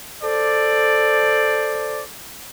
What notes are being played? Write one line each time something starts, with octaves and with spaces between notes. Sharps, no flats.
A4 C5 D5